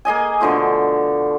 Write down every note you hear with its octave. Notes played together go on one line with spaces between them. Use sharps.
A#3 G#4 D#5 G#5
B2 D3 F3 A3